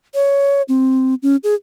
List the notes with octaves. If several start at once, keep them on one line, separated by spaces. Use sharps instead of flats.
C#5
C4
C#4
G#4